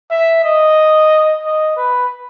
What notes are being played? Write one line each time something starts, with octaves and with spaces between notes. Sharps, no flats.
E5
D#5
D#5
B4